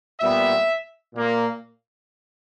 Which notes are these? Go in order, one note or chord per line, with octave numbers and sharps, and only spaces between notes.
A#2 G3 B3 E5
A#2 A#3